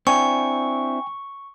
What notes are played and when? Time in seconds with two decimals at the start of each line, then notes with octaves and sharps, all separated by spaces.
0.07 C4 D4 E4 G5 G#5 C#6